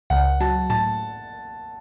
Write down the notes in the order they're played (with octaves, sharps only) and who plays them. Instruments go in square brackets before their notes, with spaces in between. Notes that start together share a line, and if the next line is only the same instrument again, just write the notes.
[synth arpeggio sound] C#2 [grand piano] F#5
[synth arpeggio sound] F#3 [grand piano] A5
[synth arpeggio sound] A2 [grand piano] A5